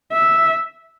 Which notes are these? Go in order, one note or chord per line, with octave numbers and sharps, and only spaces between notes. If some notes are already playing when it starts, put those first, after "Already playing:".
E5